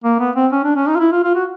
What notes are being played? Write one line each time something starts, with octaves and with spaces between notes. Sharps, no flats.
A#3
B3
C4
C#4
D4
C#4
D#4
F4
E4
F4
F4
F#4